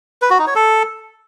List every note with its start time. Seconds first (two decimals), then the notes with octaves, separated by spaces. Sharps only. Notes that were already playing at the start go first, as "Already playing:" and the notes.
0.22 B4
0.30 F#4
0.39 D#4
0.47 C#5
0.55 A4